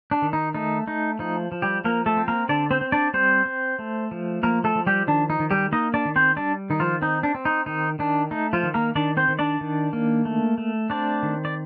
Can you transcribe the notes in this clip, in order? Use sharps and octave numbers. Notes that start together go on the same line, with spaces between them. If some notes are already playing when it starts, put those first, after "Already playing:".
D4
D#3
D#4
A3 D#4
A3 D#4
F3 D#4
F3
G3 G4
F3 A#3 A#4
A3 A4
C4
A#3 A#4
D3 D4 D5
C4 C5
C4
D4 D5
G3 C4 C5
C4
A3
F3
F3 A#3 A#4
A3 A4
F3
G3 G4
D#3 D4
D#4
D#3
G3 G4
A#3 D#4 D#5
D4 D5
D#3
C4 C5
G3 D4 D5
D#3 D#4
F3 F4
C4 D#4
D4
C4
D#4
D#3 D#4
D#3 D4
A3 D#4
F3 F4
D#3
A#3 A#4
D#3 D4 D5
C4 C5
D#3
D4 D5
D#3
A#3
A3
A3
C4 D4 D5
D#3
D5